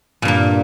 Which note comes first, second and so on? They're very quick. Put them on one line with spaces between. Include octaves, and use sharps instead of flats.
A#2 G2 A#3